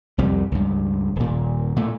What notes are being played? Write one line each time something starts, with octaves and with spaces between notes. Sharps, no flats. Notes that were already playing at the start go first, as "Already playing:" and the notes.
C2 F2 G3
C#2 G2
D#1 A#2
A#2 A3